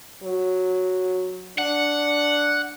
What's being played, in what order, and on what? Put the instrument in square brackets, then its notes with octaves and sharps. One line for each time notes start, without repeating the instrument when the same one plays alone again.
[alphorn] F#3
[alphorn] D4 [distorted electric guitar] F#5